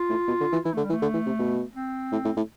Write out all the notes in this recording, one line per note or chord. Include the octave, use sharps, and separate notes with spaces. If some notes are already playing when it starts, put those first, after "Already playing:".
Already playing: F4
A2
B2
D3
E3
E3 E4
D3 A3
G3
E3
A3
D3
E3
C3
B2
C4
A2
A2
A2